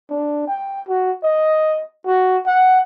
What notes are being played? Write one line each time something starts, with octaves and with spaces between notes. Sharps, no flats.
D4
G5
F#4
D#5
F#4
F#5